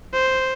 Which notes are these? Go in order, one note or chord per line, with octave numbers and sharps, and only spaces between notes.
C5